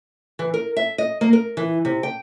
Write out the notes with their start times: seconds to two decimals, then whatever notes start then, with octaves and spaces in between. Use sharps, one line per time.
0.39 E3
0.54 A#4
0.77 E5
0.98 D#5
1.21 A#3
1.33 A#4
1.57 E3
1.85 C3
2.03 G5